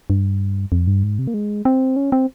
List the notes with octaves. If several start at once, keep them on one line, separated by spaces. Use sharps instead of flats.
G2
F2
G2
G#2
C3
A#3
G#3
C4
C#4
C4